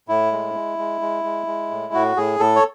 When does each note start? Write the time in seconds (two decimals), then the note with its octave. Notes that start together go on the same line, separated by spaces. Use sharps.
0.09 A2 E4
0.32 G#3
0.54 G#3
0.78 G#3
1.01 G#3
1.24 G#3
1.47 G#3
1.71 A2
1.94 A2 F#4
2.17 A2 G#4
2.39 A2 A4
2.56 C#5